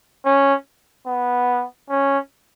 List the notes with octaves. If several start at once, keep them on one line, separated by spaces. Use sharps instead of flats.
C#4
B3
C#4